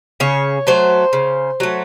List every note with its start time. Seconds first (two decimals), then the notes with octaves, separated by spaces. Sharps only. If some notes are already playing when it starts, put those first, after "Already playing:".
0.20 C#3 C#5
0.67 F#3 A3 C5
1.13 C#3
1.60 F#3 A3